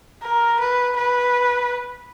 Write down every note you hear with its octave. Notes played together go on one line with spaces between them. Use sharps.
A#4
B4
B4